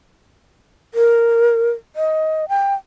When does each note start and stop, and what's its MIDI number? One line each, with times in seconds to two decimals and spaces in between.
0.94 1.70 70
1.96 2.48 75
2.49 2.74 79